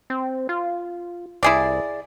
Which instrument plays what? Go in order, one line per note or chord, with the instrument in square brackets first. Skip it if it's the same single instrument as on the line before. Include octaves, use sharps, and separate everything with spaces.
[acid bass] C4
F4
[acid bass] C2 [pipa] E4 G#4 D5